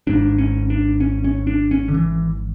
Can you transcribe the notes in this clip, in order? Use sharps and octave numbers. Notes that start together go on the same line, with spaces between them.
G#1 G#2 D4
C#4
D4
C#4
C#4
D4
C#4
D3
E3